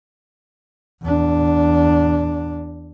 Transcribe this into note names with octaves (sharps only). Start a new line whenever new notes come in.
E2 D4